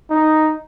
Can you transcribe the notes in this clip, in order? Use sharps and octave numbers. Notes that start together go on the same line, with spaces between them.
D#4